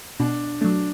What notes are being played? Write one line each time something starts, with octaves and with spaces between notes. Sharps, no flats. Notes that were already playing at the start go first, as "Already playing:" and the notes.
B2 D4
F#3 A3 D4